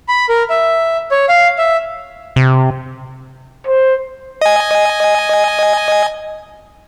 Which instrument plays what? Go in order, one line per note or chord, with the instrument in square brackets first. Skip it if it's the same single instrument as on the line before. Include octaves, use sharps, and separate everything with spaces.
[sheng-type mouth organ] B5
A#4
E5
C#5
F5
E5
[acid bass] C3
[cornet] C5
[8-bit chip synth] D#5 G#5